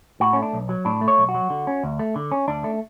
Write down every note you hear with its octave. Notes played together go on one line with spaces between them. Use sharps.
A2 F#4
A3 C#4
D4
B1
F#3
A2 D4
A3
C#5
B1
F#4
F#3
D3
C#4
D2
A3
D3
C#4
D2 D4
A3